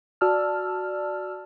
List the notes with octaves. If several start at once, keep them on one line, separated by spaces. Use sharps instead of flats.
F#4 D5 A5 E6 F6